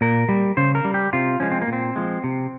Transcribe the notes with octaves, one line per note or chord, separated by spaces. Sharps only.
A#2 A#4
G3
C#3 C5
A#4
G3
G4
C3 F4
F3 G#3 C#4
C4
A#3
A#2
C4
F3 G#3
C3